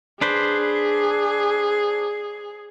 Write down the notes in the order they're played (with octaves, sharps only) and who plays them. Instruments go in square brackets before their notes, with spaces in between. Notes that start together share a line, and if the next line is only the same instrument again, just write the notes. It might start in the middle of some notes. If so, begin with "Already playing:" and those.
[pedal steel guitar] D4 B4 C5 [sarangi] G#4